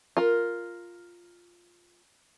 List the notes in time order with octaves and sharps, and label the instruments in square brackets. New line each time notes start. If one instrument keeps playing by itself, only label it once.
[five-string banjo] F4 A#4